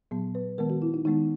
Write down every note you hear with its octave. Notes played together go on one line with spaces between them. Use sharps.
A#2 F#3 B3
B4
D#3 G#3 B3 A#4
F#4
E4
D#4
D#3 G#3 B3 D#4